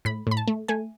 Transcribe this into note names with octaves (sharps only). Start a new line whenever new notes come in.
A2 B5
A2 B5
A5
A3
A3 G#5